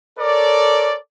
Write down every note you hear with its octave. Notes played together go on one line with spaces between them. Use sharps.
A4 A#4 C#5 D5